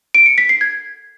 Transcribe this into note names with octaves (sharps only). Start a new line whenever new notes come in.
D7
C#7
B6
C7
G#6